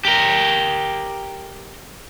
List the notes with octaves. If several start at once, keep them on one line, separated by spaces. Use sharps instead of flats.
G4 A#4